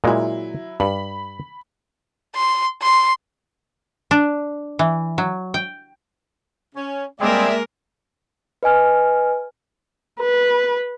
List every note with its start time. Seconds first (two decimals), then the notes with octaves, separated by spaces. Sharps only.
0.04 A#2 F#3 G#3 E4
0.80 G2 B5
2.35 C6
2.82 C6
4.11 D4
4.79 E3
5.18 F#3
5.54 G5
6.75 C#4
7.20 G3 G#3 A#3 C4 G#4 A#4 D5 E5
8.63 B4 D#5 G#5 F6
10.20 B4